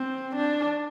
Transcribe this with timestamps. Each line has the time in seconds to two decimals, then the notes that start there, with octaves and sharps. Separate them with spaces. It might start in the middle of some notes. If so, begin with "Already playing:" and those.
Already playing: C4
0.36 D4